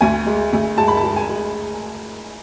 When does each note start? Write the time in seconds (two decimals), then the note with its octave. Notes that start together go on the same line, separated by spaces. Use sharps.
0.01 D2 G#5
0.26 G#3
0.53 D2
0.78 G#3 A5
0.88 B5
0.97 A5
1.03 G#3
1.16 G#5
1.29 G#3